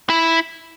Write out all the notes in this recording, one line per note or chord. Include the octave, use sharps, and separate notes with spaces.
E4